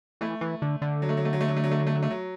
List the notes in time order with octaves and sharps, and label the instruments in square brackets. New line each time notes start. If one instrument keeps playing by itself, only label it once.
[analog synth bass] E3 [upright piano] A3
[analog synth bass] E3
D3
D3
[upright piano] F#3
A3
F#3
A3
F#3
A3
F#3
A3
F#3
A3
F#3
A3
F#3
A3
F#3